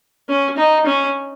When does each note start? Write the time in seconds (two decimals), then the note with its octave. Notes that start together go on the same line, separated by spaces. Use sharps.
0.29 C#4
0.57 D#4
0.86 C#4